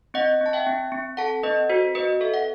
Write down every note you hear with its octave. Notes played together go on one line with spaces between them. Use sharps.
C4 D#5 F#5
C4
A5
E5 G5
C4
C4
A4 F#5 A5
C4 B4 D#5
F#4 C5
C4 B4 D#5
A4 E5
F#5